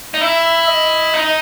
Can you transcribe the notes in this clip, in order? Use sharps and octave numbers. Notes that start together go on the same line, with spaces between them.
D#4
E4 E5
D#5
D#4